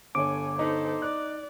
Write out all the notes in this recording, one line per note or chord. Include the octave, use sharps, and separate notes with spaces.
G1 A4 C#5 G#5 D6
D#4 A4 C5
D5 F#6